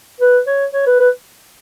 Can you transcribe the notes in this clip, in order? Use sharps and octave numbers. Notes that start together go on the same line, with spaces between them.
B4
C#5
C#5
B4
B4